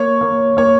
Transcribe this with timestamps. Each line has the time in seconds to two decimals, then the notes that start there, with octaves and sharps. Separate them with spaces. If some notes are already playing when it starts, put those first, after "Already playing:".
Already playing: A#3 C#5
0.21 A#3
0.57 A#3 C#5